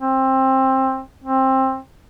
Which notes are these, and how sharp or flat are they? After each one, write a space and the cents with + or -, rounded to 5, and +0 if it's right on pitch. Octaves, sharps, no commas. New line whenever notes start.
C4 +20
C4 +20